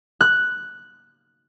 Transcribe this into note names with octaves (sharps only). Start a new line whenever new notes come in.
F#6